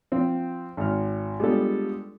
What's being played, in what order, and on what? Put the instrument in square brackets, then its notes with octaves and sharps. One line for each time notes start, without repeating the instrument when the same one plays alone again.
[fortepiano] F3 C4
G#1 F6
G3 G#3 B3 D4 F4 A4